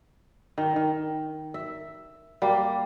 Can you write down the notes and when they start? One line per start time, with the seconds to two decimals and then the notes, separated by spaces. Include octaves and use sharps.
0.58 D#3
0.76 D#3
1.54 E5
2.42 G3 A#3